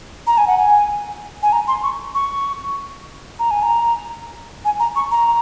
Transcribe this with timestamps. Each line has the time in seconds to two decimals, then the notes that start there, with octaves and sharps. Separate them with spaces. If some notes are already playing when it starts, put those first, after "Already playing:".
0.27 A#5
0.38 G#5
0.47 F#5
0.57 G#5
1.43 G#5
1.52 A#5
1.68 C6
1.83 C#6
2.15 C#6
3.39 A#5
3.51 G#5
3.63 A#5
4.65 G#5
4.80 A#5
4.96 C#6
5.11 A#5